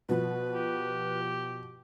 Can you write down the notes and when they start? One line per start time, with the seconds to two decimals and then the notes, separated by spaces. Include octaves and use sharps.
0.09 B2 F3 B4
0.54 G4